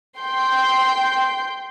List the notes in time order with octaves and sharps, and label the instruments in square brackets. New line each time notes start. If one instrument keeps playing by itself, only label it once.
[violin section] G5 C6 G6